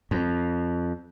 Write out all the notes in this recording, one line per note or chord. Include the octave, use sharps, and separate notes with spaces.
F2